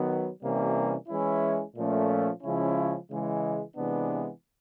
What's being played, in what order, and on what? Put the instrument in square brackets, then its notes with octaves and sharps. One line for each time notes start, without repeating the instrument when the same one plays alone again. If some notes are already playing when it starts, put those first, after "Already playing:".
Already playing: [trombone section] D#3 F#3 B3
C3 E3 G3 A#3 C#4
E3 G#3 C#4 E4
A#2 F3 A3 C#4
C#3 F3 G#3 C#4 E4
C#3 E3 G#3
C3 E3 G#3 B3 D4